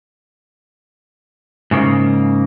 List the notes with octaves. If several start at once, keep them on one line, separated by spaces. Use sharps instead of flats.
G#2 C#3 A#3